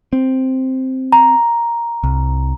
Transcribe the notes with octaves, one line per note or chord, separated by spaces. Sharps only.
C4
A#5
C2